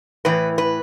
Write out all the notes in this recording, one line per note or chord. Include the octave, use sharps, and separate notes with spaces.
A2 E3 B4
B4